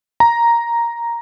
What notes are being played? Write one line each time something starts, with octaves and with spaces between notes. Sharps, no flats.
A#5